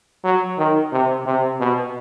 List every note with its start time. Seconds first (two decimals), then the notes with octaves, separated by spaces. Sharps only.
0.24 F#3
0.58 D#3
0.92 C3
1.26 C3
1.60 B2